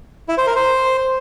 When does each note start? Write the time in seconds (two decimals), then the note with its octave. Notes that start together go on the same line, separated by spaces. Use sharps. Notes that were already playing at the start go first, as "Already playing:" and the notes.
0.29 E4
0.38 C5
0.47 A#4
0.56 C5